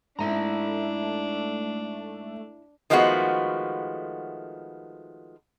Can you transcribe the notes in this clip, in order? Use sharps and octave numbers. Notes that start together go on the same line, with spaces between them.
G#2 A3 D4 E4 E5 A#5
D#3 F3 G#3 A3 B3 F#4